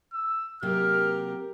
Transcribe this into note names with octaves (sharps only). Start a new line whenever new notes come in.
E6
C3 F#3 A#3 G4 A#4 F6